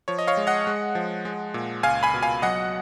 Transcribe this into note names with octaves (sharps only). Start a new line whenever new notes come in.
F3 C#5
D#5
C#5 F5
G#3
D#5 F#5
G#3
F3
G#3
A#2
C#2 F5 G#5
G#5 B5
B2
F5 G#5
F#3 D#5 F#5